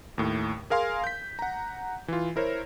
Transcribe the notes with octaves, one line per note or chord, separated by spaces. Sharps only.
D#2 A2
G#4 A#4 F5 G#5 C6
G6 B6
F#5 A#5
E3 F4
E4 A#4 C5 C#5